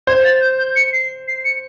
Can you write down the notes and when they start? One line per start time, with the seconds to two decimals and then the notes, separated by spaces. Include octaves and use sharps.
0.07 C5 G#6
0.25 A6
0.41 G6
0.58 G6
0.76 C#7
0.93 C7
1.28 C7
1.45 C#7